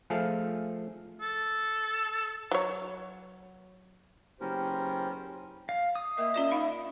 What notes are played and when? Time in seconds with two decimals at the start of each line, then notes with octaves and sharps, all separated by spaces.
0.10 F3 A3 G#4 A4 F5
1.21 A4
2.51 F#3 C#5
4.41 F#1 B3 C#4 G4 A#4 C5
5.69 F5
5.95 D#6
6.17 A#3 A#4 D#5 E5
6.34 C#4 F4 D5
6.51 D#4 F5 B5